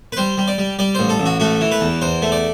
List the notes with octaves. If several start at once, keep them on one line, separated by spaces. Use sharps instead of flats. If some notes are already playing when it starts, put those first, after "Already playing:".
B4
G3 C5
G3
D5
G3
G3 D5
A1 C5
A4
A1
F#4
A3 F#4
E3
B4
E2
E2 C5
A3
D5